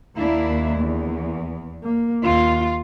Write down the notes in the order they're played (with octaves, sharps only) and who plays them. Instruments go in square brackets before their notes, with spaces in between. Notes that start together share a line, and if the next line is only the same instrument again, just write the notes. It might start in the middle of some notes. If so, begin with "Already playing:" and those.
[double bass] D#2 [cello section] A#3 D4 E4
[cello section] E2
[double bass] A#3
[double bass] D#2 [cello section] F4